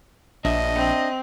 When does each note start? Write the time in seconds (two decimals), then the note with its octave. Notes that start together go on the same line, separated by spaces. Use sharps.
0.45 A#1 D4 D#5 E5
0.75 C4